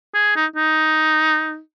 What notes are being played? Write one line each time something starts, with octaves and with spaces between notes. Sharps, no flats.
G#4
D#4
D#4